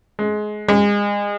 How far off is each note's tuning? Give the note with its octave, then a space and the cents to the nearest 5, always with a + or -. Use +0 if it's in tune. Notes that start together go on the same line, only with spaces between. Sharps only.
G#3 +20
G#3 -30